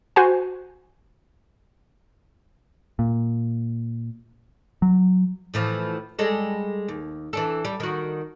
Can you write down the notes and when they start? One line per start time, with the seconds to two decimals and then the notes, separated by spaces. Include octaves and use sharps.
0.16 F#4 C5 G#5
2.99 A#2
4.82 F#3
5.54 A2 E3 F3
6.19 G3 G#3 A4
6.88 D#2
7.33 E3 D4 A4
7.65 G3
7.80 D#3 F#4